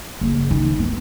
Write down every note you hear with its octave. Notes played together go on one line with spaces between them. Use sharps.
F#1
D#3
B3